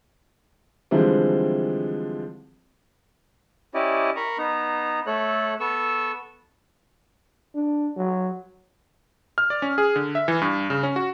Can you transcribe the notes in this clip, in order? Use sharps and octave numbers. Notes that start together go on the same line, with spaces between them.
D3 E3 F3 G3 G#3 C4
C#4 E4 G4 D5 D#5
A#4 A#5 B5 C#6
B3 D#4 A#5
A3 A4 C#5 F#6
B3 A4 C#6 E6
D4
F#3
F6
D5
C#4
G#4
D3
E5
E3
G2
C#3
C#4
F#4